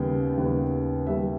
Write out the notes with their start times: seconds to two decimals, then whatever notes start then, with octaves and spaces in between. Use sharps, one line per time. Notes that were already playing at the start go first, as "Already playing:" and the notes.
Already playing: D#2 C#3 G3 B3 G5
0.37 D#2 C#3 G3 B3
1.07 D#2 C#3 G3 B3 E5